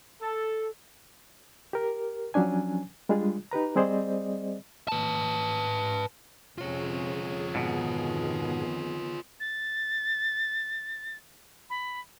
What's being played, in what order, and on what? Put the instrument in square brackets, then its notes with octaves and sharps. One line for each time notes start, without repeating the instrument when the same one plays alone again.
[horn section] A4
[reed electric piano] G4 A#4
F3 F#3 C#4 D4 G#5
G3 G#3 D4 F4 G#4
D#4 G4 B4 A#5
G3 C4 G#4 C5 D5 D#5
[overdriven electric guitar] B4 A5
[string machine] F2 G#4 [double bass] C3 C#4 [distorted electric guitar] F4 C#5
[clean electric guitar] G#2 B2 [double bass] D#3 B3
[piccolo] A6
B5